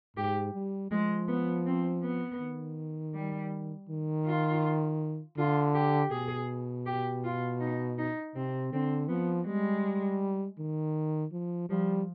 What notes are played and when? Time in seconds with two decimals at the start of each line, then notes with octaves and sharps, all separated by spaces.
0.17 G#2 G4
0.54 G3
0.91 F3 G#3
1.28 B3
1.66 C4
2.03 B3
2.40 D#3
3.15 G3
3.89 D#3
4.26 F4
5.38 D3 F4
5.75 G4
6.11 B2 G#4
6.86 G4
7.24 F4
7.60 D#4
7.99 D#4
8.35 C3 C4
8.73 D3 C4
9.09 F3 B3
9.46 G3 G#3
10.59 D#3
11.32 F3
11.70 F3 G3